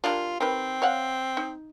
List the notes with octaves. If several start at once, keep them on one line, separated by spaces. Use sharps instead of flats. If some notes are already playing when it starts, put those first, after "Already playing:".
G3 A#3 D4 F4
D#3 C4 G4 B4
C#5 F5 F#5
D#4